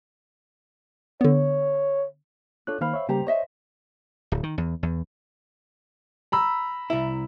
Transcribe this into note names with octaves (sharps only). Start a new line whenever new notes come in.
D3 B3 C#5
D4 F4 A4 C#5 F#6
D#3 A#3 C5 F5 B5 F6
C#5 E5
C#3 G3 A#3 G4 C5 A#5
C5 C#5 D#5 E5
D1
D#3
E2
E2
A#5 B5 E6
C2 E4